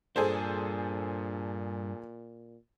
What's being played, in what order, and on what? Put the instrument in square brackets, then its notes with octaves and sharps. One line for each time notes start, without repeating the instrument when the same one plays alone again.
[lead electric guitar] G2 D4 [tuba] A#2 [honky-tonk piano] G#4 A4 C5